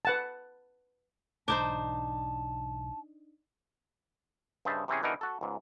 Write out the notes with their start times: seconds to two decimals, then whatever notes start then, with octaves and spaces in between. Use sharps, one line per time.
0.05 B4 F#5 A5
1.48 B1 G#2 E3 D4 D#4 C5 A5
4.65 G2 C#3 C5 D#5 E5 A5
4.88 C3 E3 C4 C#4 G#4
5.03 B2 D3 E3 D#4 A#4
5.21 F#4 A4
5.41 C#2 G#2